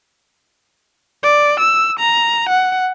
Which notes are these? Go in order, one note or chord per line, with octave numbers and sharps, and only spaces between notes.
D5
E6
A#5
F#5